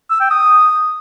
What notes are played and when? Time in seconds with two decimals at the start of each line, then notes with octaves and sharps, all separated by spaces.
0.11 E6
0.21 G5
0.31 D#6